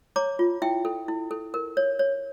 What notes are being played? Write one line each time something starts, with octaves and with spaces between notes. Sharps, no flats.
C#5 A#5 D6
F4
E4 E5 G5
A4
E4
A4
A#4
C#5
C#5